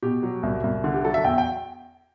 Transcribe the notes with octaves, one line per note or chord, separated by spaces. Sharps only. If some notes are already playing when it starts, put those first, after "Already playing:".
B2 G4
F#3
C2
C2
D3
G4
F#3 A4
E5
E2 G5
G5